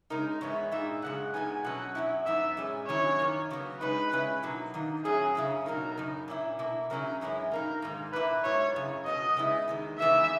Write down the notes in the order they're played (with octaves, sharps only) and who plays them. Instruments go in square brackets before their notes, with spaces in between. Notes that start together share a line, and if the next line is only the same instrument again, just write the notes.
[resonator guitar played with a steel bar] C#3 G#3 D#4 [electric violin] A#4
[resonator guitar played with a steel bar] G#2 E3 G#3 B3 E4 [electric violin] C#5
[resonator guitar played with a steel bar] A#2 G#3 D#4 [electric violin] E5
[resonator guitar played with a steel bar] F#2 C#3 G#3 [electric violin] F#5
[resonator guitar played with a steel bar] A#2 G#3 B3 D#4 [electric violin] G#5
[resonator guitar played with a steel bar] B2 F#3 C#4 [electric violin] F#5
[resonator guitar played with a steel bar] F#2 C#3 F#3 C#4 E4
[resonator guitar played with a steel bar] F#2 E3 B3 D#4 [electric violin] E5
[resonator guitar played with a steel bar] A#2 G#3 C#4
[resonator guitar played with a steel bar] D#3 F#3 C#4 E4 [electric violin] C#5
[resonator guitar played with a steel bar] F#2 D#3 A#3
C#3 F#3 B3
[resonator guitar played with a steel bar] C#3 G#3 D#4 [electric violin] B4
[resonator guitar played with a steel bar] C#3 G#3 C#4 E4
B2 F#3 A#3 D#4
D#3 A#3 D#4
[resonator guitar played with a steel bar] A#2 F#3 C#4 E4 [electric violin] G#4
[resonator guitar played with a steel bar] F#2 C#3 F#3 C#4 E4
[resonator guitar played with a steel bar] B2 F#3 A#3 D#4 [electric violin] A#4
[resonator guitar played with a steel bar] F#2 C#3 D#4
A#2 A#3 C#4 E4
B2 A#3 E4
[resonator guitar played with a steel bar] C#3 F#3 C#4 E4 [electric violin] A#4
[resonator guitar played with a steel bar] F#2 E3 G#3 C#4 E4
[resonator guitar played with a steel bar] B2 A#3 D#4 [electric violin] A#4
[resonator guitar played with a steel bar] G#2 D#3 A#3
[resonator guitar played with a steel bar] A#2 A#3 E4 [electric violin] B4
[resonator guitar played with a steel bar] G#2 F#3 B3 E4 [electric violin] C#5
[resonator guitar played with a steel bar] F#2 C#3
[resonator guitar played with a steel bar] B2 F#3 B3 [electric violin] D#5
[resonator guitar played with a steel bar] C#3 G#3 B3 E4
E2 D#3 G#3
[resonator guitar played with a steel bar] C#3 E3 G#3 B3 D#4 [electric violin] E5